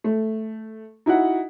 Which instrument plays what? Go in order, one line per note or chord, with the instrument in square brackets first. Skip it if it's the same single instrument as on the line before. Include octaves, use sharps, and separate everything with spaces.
[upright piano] A3
D#4 E4 F#4 F#5